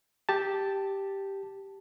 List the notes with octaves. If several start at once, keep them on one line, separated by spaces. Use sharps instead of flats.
G4 A5